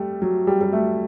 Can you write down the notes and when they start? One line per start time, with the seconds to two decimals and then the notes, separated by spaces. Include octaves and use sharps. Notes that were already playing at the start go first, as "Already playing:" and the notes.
Already playing: G3 A3
0.22 F#3
0.47 G3
0.61 G3
0.73 A3